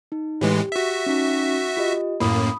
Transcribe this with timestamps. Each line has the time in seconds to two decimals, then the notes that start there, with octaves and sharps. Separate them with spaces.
0.12 D#4
0.41 A2 E3 G#3 G4
0.72 F#4 E5
1.06 C#4 D#4
1.77 F4 G4 D#5
2.20 F#2 A2 A#3 B5 D#6